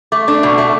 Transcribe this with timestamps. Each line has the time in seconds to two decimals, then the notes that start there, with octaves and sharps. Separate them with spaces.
0.12 A3 D6
0.28 D4
0.43 B2
0.58 A3